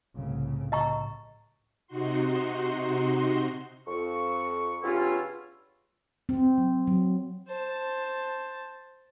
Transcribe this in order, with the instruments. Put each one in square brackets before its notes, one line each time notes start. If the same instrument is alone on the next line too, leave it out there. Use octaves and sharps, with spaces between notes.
[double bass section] C2 A2 C#3
[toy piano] D#5 A#5 C#6
[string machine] C3 D#4 F#4 C6
[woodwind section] F2 C#6
G2 C#3 B3 C#4 E4 F4
[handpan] C4
F#3
F#3
[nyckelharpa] C5 A5